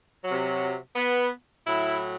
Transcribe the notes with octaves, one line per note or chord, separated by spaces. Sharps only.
C3 F#3
B3
A2 F#3 E4